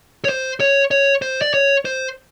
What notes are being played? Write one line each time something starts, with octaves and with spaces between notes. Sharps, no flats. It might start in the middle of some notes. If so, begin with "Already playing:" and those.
C#5
C5
C#5
C#5
C5
D5
C#5
C5